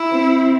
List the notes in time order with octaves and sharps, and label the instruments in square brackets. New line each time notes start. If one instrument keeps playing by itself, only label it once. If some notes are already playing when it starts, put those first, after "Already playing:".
Already playing: [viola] E4
[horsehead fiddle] C4